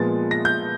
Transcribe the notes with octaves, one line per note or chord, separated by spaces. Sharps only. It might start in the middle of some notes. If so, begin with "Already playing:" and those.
Already playing: A#2 F3 G#3 B3 A6
A#6
G6